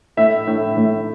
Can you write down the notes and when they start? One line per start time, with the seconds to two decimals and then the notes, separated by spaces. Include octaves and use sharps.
0.17 A2 E5
0.47 A2
0.77 A2